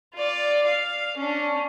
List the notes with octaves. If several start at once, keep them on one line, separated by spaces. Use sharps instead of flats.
F4 D5
F5
C#4 D4